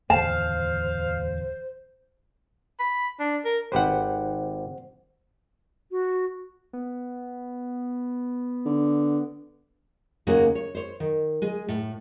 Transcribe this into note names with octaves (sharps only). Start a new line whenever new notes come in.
D1 E2 D#3 C5 F5 A5
B5
D4
A#4
G#1 G4 B4 C5 F#5
F#4
B3
D3
D#2 C#3 A#3 C#4 F#4 G#4
C#5
C5 C#5
D#3
G#3 G#4
A2